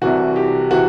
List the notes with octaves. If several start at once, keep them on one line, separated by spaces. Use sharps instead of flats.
C2 C3 E3 F#4
G4
C3 E3 F#4